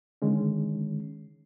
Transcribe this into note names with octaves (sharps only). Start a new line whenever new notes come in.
D3 D#3 G#3 C#4